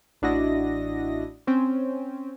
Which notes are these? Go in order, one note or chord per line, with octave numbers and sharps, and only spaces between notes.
A1 D4 E4 F#4 D#5 A#6
C4 C#4